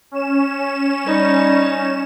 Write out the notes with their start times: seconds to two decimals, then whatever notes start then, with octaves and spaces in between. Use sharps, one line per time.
0.11 C#4 E7
1.06 G3 D#4